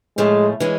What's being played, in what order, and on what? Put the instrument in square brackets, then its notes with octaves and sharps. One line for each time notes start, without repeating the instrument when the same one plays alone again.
[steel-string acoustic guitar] A2 F3 A3 [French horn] G#3
[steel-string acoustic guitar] E3 G#3 C#4